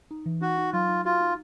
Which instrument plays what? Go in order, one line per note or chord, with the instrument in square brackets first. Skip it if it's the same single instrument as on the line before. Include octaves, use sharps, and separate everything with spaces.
[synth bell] D#4
E3
[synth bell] D#4 [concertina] F#4
[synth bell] D#4
[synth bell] F#3 [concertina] F4
[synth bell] D#4
[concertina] F4 [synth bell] F#4
[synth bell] D#4